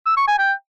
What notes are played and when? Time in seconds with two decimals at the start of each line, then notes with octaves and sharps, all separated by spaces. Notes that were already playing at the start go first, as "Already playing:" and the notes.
0.06 E6
0.17 C#6
0.28 G#5
0.38 G5